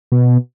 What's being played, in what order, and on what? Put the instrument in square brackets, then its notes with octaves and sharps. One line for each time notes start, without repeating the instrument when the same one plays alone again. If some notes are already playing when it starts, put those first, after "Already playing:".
[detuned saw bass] B2